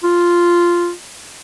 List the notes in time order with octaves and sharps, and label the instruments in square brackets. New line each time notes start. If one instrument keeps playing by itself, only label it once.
[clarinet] F4